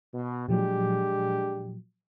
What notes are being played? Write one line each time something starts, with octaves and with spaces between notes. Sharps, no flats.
B2
A#2 F3 F#3 G#3 D4 G4